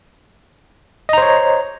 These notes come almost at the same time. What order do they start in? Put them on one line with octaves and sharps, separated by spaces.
D#5 A#5 C5 C#5